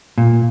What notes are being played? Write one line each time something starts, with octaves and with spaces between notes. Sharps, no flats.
A#2